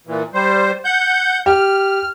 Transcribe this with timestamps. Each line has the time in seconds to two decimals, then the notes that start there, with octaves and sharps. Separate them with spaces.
0.07 A#2 E3
0.34 G3 C5
0.85 F#5 G6
1.46 G4 F6